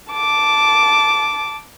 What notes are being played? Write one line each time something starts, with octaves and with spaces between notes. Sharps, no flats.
A5 D6